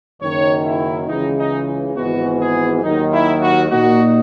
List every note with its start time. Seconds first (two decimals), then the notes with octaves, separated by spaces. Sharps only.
0.21 F#1 F#2 D#3 C#5
0.65 E4
1.07 C#2 C#3 E3 D#4
1.37 D#4
1.95 G#1 G#2 E3 B3 F#4
2.39 G#4
2.82 D#2 D#3 F#3 D#4
3.11 E4
3.40 F#4
3.69 A#2 A#3 D#4 F#4